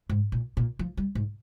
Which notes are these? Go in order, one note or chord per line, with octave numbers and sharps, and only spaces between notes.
G#2
A#2
A#2
F3
G3
G#2